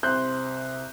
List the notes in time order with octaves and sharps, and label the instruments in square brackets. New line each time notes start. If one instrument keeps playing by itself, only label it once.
[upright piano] C2 C3 C5 F#6 G6